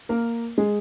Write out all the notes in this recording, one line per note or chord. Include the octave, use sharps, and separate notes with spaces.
A#3 A#4
G#3 G#4